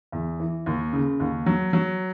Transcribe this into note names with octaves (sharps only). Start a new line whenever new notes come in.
E2
E3
D#2
C#3
D#2
F#3
F#3